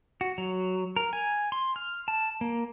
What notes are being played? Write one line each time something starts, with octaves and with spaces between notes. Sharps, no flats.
F#4
F#3
A#4
G#5
C6
F6
A5
A#3